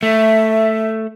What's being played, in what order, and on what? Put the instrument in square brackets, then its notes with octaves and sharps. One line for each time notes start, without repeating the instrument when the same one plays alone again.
[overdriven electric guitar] A3 [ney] E5